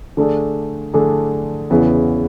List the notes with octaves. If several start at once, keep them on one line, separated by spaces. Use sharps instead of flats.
D3 A3 D4 G#4
D3 A3 D4 G#4
E2 C#3 E3 B3 E4